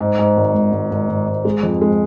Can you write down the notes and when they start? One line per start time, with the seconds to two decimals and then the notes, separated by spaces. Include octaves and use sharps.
0.01 G#2
0.19 G#2
0.37 G#1
0.54 G#1
0.73 G#1
0.91 G#1
1.09 G#1
1.27 G#2
1.45 G#3
1.63 F2
1.82 G#3